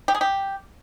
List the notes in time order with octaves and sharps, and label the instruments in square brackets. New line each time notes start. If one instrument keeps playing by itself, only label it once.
[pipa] G4
G#4
G4